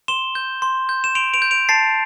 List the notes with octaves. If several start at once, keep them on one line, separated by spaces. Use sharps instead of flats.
C6 E7 G7
G6
C6
G6
E7
C6 D7 F7
D7 F7
G6
D7 F7
A5 A6 C7